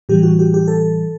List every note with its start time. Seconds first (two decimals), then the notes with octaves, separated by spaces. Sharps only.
0.09 A2 E3 G3 G4
0.23 F#4
0.39 G4
0.54 G4
0.68 A4